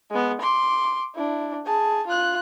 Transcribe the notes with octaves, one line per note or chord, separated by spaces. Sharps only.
G#3 B3
C6 D6
D4 E4
G#4 A5
F4 F#6